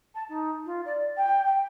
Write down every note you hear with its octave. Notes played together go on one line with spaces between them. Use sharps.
A5
D#4
F4
D5
G5
G5